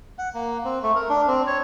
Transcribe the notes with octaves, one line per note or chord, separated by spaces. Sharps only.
F#5
A#3
C4
A3
A#4
D4
C4
C#5